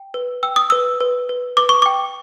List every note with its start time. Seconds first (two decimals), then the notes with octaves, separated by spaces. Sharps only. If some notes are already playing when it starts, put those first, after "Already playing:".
Already playing: G5
0.14 B4
0.43 G5 E6
0.56 D#6
0.70 B4 E6
1.00 B4
1.29 B4
1.57 B4 D6
1.69 C#6
1.82 G5 D6